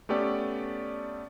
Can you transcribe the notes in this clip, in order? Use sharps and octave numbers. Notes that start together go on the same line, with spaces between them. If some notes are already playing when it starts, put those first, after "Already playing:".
A3 B3 C#4 G4 A4 D5